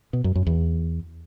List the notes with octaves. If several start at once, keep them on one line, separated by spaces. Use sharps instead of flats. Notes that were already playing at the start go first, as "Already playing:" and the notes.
B2
F#2
F#2
E2